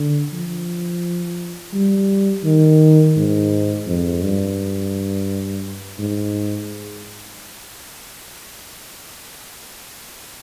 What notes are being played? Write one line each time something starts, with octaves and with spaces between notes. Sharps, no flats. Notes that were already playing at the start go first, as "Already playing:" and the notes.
Already playing: D3
F3
G3
D#3
G#2
F2
G2
G#2